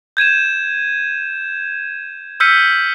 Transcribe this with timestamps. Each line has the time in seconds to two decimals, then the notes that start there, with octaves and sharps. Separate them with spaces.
0.17 G6 G#6 D#7 E7
2.40 E6 F6 G6 B6 C#7 D#7